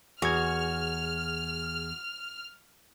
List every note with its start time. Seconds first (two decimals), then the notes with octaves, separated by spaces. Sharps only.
0.22 E2 F#4 G#4 F6 G#6